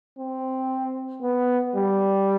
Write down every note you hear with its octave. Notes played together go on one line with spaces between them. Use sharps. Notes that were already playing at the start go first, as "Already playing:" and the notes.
C4
B3
G3